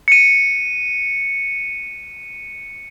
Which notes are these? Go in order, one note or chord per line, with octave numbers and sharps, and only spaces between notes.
C#7 D#7